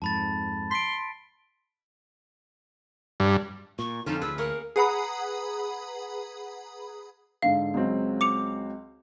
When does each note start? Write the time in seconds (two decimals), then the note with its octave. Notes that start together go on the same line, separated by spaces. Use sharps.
0.02 F2 G#2 A5 B5 A6
0.71 C6 B6 D7
3.20 G2
3.79 A#2 C#6
4.06 F2 D3 C#4 D#4 F4 A4
4.22 D2 G#4 B4 E6
4.38 A#3 A#4 C#5 F#5
4.76 G#4 B4 F#5 A#5 B5 D#6
7.42 G#2 D3 F5
7.74 C#2 F#3 C4
8.21 D6 C#7 F7